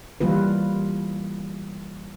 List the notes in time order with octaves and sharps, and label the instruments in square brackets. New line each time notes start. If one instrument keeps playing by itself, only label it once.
[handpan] E3 G3 A#3 F4 B4